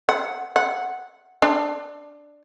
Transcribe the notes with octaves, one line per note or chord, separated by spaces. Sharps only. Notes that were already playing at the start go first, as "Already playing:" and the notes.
F#5
F#5
D4